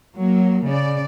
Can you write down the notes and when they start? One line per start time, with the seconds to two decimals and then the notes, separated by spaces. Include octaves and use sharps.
0.15 F#3 A#3
0.66 C#3 D5